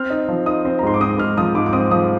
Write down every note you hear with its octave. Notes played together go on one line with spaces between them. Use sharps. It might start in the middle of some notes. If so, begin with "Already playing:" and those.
Already playing: C4 F6
D#4
F3
D#4 D#6
C4
A#5
G#2 C6
D6
C4 D#6
G#2 F6
F3 D#6
G#2 D6
D6
C4 D#6
F3 D#6